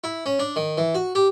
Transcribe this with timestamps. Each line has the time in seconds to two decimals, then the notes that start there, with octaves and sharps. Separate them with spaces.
0.04 E4
0.26 C#4
0.39 D4
0.56 D#3
0.78 E3
0.95 F#4
1.15 G4